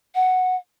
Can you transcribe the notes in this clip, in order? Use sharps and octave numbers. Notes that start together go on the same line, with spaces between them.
F#5